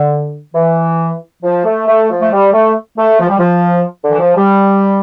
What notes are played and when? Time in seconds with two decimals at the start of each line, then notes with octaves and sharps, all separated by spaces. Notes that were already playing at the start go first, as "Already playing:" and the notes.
Already playing: D3
0.54 E3
1.43 F3
1.65 A3
1.88 A3
2.10 F3
2.21 A3
2.32 G3
2.53 A3
2.98 A3
3.20 F3
3.29 G3
3.39 F3
4.03 D3
4.11 E3
4.19 F3
4.36 G3